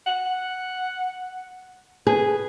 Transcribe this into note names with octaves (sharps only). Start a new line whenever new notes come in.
F#5
G#4 B4